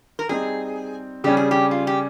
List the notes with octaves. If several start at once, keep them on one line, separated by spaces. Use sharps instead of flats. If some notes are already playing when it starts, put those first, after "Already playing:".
A#4
G3 C4 D#4 G#4
C#3 G3 C#4 G4
G#4
G4
F4
G4